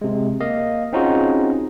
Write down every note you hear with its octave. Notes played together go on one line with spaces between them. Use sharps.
C3 G#3
A#3 D#5 F5
C4 C#4 D#4 F4 F#4 G#4